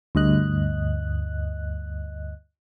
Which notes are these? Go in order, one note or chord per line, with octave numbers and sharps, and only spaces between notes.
D2 G2 D#5 F#6